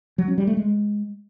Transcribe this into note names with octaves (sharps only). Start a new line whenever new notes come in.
F#3
C#4
G3
A3
G#3